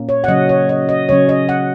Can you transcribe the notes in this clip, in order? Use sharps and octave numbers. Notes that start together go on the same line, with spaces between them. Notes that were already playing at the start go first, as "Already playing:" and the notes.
Already playing: A#2 A#3 C#4
C#5
F#5
C#3 F#3 C#4 D#5
C#5
D#5
D#5
C#3 F#3 C#4 C#5
D#5
F#5